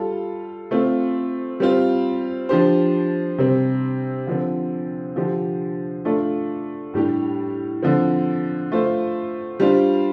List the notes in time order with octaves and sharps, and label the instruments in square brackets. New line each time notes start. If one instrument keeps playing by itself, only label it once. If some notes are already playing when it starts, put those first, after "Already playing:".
Already playing: [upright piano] G3 F4 A4
A3 C4 F4
G3 C4 F4
F3 D4 G4 C5
C3 G3 C4
D3 F3 C4
D3 F3 D4 G4 C5
A3 D4 F4 A4 D5
A2 G3 D4 G4
D3 F3 C4
A3 F4 C5
G3 D4 F4 C5